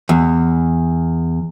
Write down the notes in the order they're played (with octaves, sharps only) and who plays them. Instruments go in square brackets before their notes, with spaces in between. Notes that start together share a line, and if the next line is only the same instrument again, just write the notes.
[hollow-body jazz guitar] E2